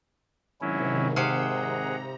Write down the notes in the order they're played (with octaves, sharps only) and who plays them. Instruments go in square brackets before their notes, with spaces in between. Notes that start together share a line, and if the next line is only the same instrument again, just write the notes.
[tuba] G#1 [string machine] C3 D#3 [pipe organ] F#3 C#4 E4
[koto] C3 F5 [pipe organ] G#4 F#5 [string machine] E6 G6
[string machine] A#5